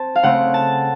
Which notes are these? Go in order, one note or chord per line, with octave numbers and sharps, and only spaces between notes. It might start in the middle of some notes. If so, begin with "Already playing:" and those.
Already playing: C4 A5
F5
C#3 A3 C4 F#5
A5